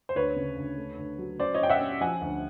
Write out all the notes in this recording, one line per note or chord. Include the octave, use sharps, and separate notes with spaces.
C5
D2 B4 C#5
C#3
D2
A3
D2
F#3
C#4 C5 D5
C#5 D#5
C#4 G5
E5 F#5
C#4
F3 F#5 G#5
D2